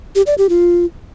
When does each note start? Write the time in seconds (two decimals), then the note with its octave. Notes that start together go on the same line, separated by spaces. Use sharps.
0.15 G4
0.27 D5
0.38 G4
0.49 F4